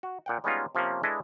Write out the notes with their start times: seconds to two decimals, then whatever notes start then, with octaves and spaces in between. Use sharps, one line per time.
0.03 F#4
0.26 A#2 F#5 G5
0.44 G3 G#3 B3 C#4 D#4 F4
0.75 C3 F3 A#3 C#4
1.03 G#3 D4 E4 A4 B4 D#5